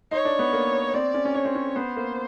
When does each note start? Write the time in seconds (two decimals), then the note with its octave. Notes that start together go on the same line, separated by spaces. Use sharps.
0.11 D#4 C#5
0.25 D4
0.39 B3
0.53 A#3
0.94 C4 D5
1.14 C#4
1.25 C#4
1.34 D4 C#5
1.45 C4
1.55 C#4
1.76 B3 C5
1.96 A#3